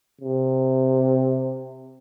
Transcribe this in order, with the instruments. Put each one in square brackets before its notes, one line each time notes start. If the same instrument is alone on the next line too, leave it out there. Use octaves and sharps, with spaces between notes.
[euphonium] C3